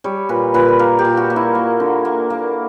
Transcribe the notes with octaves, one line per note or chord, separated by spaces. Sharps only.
G3 C#5
A#2 B4
A#2 B4
A#3 A#4
G4
A#2
F#4
A#3
E4
A#3
D3
A#3
A#3